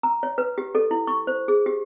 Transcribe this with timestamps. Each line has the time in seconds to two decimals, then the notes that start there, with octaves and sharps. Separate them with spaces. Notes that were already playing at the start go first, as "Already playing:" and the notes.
0.03 A#5
0.23 C#5
0.38 B4
0.58 G4
0.75 A4
0.91 E4
1.07 C#6
1.27 C5
1.48 G#4
1.66 G4